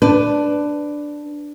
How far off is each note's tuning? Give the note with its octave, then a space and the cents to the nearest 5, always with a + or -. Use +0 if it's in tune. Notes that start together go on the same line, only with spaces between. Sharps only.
D4 +0 B4 +15